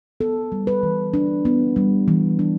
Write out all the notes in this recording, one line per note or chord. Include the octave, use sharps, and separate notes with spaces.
B3 A4
G3
B4
E3
D4
B3
G3
E3
D4